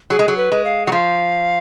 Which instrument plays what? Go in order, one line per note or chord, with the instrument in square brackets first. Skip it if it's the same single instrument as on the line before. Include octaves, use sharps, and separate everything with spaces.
[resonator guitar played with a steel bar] F#3 [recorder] G#4
[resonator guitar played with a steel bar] G#3
F#3
[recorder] B4
[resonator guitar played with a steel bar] G#3
[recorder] F5
[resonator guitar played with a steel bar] F#3 [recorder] F#5
[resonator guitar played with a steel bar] F3 [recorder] F5